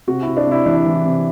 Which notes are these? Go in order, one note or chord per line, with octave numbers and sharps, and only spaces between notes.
C3 F#4
C3 E4
D4
C3 E4
E3 D4
E3
C3